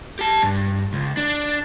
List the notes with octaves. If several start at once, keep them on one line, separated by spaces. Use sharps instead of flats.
G4 A5
G2
C#2
D4